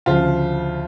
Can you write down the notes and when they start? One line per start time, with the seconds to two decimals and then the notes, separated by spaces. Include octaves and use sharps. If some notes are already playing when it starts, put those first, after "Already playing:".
0.06 D2 C#3 F3 F4